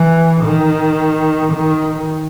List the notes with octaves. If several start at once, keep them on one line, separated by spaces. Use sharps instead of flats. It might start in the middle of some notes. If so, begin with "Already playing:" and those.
Already playing: E3
D#3
D#3